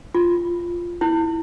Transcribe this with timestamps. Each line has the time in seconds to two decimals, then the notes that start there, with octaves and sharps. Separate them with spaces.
0.15 F4
1.01 E4